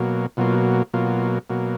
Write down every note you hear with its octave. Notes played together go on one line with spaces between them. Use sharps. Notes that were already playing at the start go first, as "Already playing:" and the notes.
Already playing: B2 F#3 A#3
B2 F#3 A#3 F4
B2 F#3 A#3 F4
B2 F#3 A#3